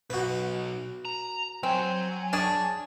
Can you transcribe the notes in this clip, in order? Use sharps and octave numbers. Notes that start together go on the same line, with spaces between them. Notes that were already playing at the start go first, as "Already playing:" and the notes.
B1 F#4 B4
A#5
F#3 C4 G#5
D4 G#4 C#5 A5